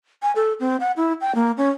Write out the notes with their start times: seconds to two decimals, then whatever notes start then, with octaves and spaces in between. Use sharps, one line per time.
0.22 G#5
0.36 A4
0.60 C4
0.80 F#5
0.97 E4
1.21 G5
1.35 A#3
1.57 C#4